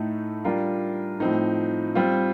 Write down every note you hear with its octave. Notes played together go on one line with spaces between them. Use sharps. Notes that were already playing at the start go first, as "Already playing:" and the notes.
Already playing: A2 A3 D#4 A4
G3 D4 F4 A#4
A2 F3 C4 D#4
G3 C4 F4